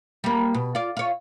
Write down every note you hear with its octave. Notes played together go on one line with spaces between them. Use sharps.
G3 A#3
B2
F4 D5
F4 C#5